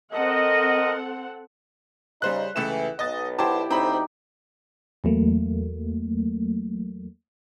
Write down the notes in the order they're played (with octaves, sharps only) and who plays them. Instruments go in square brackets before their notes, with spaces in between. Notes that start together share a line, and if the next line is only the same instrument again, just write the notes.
[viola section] C4 A4 F#5 [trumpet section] A#4 D#5
[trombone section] C#3 D#4 [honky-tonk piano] G3 C5 F#6
[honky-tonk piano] C#2 A3 E7 [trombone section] E3
[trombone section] B1 B3 [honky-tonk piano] D#5 A6
[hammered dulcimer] E4 G4 [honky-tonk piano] C5 A5
[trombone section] D2 A2 [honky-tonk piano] C4 B5 [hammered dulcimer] D#4
[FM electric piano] E2 F#3 A3 A#3